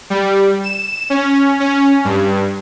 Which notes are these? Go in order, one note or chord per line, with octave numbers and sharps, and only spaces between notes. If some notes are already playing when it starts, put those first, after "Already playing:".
G3
E7
C#4
C#4
G2